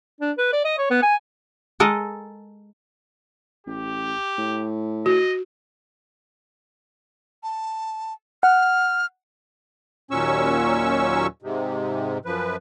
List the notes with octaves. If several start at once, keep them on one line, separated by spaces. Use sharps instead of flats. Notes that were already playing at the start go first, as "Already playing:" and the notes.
D4
B4
D5
D#5
C#5
B3
G#5
G#3 A4 A#4 D#5
A1 G4
A2
F#4 D#5
A5
F#5 F6
D#2 A#2 F#3 C#4 C#6 E6
G#2 C3
F#2 F3 B4